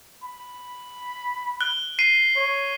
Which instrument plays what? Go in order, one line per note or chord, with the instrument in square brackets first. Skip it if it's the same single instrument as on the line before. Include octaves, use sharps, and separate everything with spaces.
[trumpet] B5
[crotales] F#6 G7
C7 D#7
[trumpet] C#5